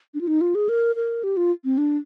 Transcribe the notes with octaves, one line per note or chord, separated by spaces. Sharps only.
D4
F4
D#4
F4
G#4
A#4
A#4
G4
F4
C4
D4